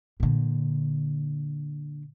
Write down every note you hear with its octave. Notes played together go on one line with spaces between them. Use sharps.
A#2 D3